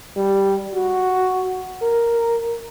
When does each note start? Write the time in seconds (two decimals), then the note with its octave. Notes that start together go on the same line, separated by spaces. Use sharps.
0.17 G3
0.74 F#4
1.82 A#4